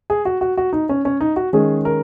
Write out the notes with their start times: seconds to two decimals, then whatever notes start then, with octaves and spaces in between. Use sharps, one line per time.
0.10 G#4
0.25 F#4
0.41 F#4
0.57 F#4
0.73 D#4
0.89 C#4
1.05 C#4
1.21 D#4
1.36 F#4
1.53 D#3 G#3 C#4 G#4
1.85 A#4